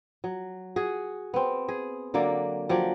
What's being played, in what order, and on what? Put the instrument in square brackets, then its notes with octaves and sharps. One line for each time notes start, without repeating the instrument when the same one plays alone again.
[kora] F#3
F#4 G#4
B3 C4
G#4
D3 F#3 A#3 D5
F3 F#3 G4 D5